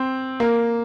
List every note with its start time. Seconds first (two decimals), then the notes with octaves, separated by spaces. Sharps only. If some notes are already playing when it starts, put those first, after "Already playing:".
Already playing: C4
0.40 A#3